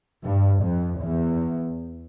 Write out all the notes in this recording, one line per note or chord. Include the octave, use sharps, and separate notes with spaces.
G2
F2
E2